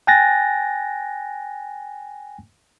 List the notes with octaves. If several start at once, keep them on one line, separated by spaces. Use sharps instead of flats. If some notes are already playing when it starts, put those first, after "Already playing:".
G5 G#5 F#6 A6 A#6